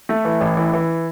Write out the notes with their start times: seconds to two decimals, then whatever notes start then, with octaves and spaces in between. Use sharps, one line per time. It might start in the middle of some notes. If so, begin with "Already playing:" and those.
0.09 A3
0.25 E3
0.41 A1
0.57 E3
0.73 E3